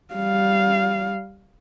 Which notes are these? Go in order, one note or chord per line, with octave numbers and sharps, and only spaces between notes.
G3 F5